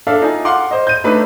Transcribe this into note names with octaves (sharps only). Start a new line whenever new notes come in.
D4 A4 E5 F5
D#4 F4 G#5
F5 F#5 C6 D6
C5 D#5
G6 D#7
A3 D4 D#4 A4 B4